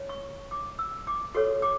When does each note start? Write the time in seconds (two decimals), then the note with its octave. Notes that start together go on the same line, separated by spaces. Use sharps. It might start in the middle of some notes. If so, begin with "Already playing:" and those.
Already playing: C#5
0.09 C#6
0.51 D6
0.79 E6
1.07 D6
1.34 F#4 A4 C#5 C#6
1.62 D6